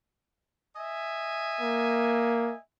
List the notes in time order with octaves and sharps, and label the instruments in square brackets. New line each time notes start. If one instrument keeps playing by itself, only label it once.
[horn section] D#5 E5 G#5
[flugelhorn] A#3